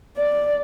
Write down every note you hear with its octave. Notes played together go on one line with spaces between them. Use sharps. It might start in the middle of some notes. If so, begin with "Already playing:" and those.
D5